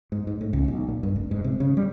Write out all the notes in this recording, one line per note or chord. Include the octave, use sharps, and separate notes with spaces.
G#2
G#2
A2
C#2
B1
A#2
G2
F1
G#2
C3
C#3
G3